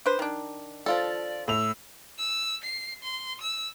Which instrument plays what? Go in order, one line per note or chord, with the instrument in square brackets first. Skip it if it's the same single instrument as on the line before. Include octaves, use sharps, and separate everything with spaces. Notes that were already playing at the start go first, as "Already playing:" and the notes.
[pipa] D4 B4 C5
D#3 D4
[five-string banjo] F3 F4 A4 [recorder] D5
[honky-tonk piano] A2 F7 [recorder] E6
[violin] E6
C7
C6
E6